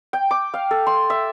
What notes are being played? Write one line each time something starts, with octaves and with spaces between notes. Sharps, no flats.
G5
D6
F5
A4
C6
E5